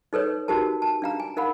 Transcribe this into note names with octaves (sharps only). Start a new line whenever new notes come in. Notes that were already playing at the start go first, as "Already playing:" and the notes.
D#4 A4 B4 C#5
D#4 F#4 G4 A#4 A5
A5
D4 F5 A#5
G#5
D#4 A#4 F5 F#5 B5